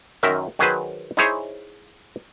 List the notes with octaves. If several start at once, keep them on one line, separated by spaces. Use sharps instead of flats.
F#2 D#3 A#4 E5
D#3 F#3 G#4 B4 C5
D#4 E4 G#4 C5 C#5